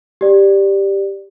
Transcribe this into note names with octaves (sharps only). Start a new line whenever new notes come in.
G4 D5